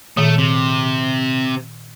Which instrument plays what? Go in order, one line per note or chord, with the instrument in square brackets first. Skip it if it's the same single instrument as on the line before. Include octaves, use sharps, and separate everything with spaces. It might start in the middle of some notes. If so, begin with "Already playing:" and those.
[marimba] A#2 D#3 [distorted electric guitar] A3
[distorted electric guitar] C3